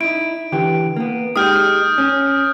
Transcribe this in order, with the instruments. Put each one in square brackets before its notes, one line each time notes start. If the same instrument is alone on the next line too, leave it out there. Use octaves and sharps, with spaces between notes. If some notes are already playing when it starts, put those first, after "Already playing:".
[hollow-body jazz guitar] D#4 E4 [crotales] D7
[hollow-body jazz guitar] D3 E3 G4
A#3 B3
[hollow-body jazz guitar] G#3 D#4 G4 [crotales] D#6 F6 G6
[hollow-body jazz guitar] C#4